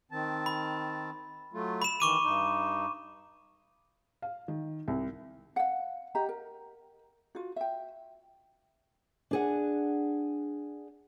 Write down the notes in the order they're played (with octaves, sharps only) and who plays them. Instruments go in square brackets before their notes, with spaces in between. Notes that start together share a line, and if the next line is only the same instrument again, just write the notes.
[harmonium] D#3 C4 A5
[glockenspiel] B5
[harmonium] F#3 A3 F4
[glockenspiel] B5 E7
[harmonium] D#3 E3 [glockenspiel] C#6 D6 D#7
[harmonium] G2 D#4
[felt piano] F5
D#3
C2
[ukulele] F5 F#5
G4 D#5 A#5
A#4
F4 F#4
E5 G5
[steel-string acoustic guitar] D4 G#4 F#5